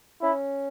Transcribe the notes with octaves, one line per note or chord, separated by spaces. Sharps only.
C#4 E4